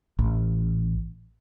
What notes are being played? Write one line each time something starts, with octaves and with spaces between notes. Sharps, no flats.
A1